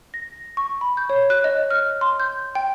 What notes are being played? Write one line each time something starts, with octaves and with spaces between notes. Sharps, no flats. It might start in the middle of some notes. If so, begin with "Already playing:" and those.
A#6
C#6
B5
G6
C#5
F#6
D#5
F6
C6
G6
G5